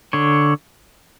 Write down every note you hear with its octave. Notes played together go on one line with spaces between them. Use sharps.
D3 C#5